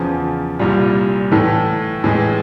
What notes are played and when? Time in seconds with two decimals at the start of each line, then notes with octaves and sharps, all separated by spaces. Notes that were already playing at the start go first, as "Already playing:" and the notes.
Already playing: E2 C#3 F3
0.59 C2 A#2 G3
1.31 A2 E3 A3
2.04 A2 E3 G#3